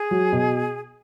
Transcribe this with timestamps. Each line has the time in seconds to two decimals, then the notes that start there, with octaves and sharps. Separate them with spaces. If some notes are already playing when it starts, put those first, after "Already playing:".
Already playing: G#4
0.11 F#3
0.32 B2